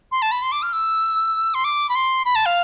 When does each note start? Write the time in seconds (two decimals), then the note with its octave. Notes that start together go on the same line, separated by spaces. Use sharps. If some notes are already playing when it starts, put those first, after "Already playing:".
0.12 C6
0.22 A5
0.32 B5
0.42 C6
0.52 D6
0.62 F6
0.73 E6
1.55 C6
1.64 D6
1.89 B5
1.95 C6
2.25 B5
2.36 A5
2.46 F5